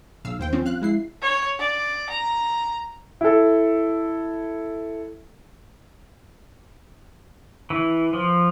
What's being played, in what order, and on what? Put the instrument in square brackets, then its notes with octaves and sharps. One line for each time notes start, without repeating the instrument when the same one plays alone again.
[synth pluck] B1 F5 E6
D#2 C5 G5
F3 C4 C#4
F5 F#6
G#3 E4 C7
[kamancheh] C#5
D5
A#5
[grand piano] E4 A4
[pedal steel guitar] E3
F3